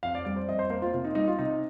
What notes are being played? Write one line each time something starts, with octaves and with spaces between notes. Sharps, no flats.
F2 F5
D5
G3 D5
C5
F2 D#5
C5
A#3 C5
F4
C3 F4
D#4
G3 D#4
F4
C3 D#4